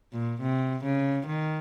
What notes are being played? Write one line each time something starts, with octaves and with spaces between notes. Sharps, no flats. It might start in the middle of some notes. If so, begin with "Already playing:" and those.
A#2
C3
C#3
D#3